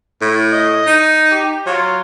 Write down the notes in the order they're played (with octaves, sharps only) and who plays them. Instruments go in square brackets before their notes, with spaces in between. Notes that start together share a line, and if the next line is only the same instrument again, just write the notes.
[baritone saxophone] A2
[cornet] D#5
[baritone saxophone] D#4
[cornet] G4
[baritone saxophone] F#3 [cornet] F4